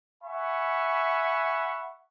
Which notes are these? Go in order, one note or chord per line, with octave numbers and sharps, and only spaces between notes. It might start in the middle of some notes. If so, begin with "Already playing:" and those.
E5 F#5 G#5 B5 C#6